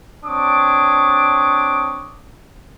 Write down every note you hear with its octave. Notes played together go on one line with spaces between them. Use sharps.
C4 D4 C#5 D6 D#6